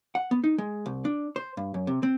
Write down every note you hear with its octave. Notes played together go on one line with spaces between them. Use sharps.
F#5
B3
D#4
G#3
C2
D4
C5
G2
F#2
C3
C4